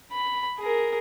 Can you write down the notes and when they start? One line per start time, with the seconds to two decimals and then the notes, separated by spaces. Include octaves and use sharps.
0.12 B5
0.59 G#4 A#4